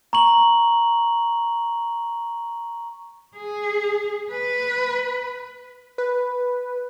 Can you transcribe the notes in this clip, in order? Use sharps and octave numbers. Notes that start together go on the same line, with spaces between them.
A#5 C#6 F#7
G#4
B4
B4